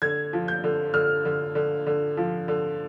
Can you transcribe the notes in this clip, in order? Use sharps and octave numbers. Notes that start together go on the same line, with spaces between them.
D3 G#6
F3
G6
D3
D3 F6
D3
D3
D3
F3
D3